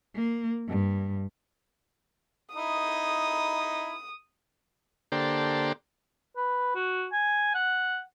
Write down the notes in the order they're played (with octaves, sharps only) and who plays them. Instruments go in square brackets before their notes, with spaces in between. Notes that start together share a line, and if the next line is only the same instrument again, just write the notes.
[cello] A#3
G2
[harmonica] D#4 E4 [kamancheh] D#6
[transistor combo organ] D3 A#3 D4 G4 A4 C5
[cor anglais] B4
F#4
G#5
F#5